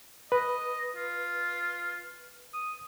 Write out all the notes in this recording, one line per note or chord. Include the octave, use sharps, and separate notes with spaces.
B4 D#5
F4
D#6